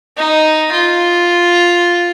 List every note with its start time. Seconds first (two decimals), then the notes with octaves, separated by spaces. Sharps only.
0.17 D#4
0.72 F4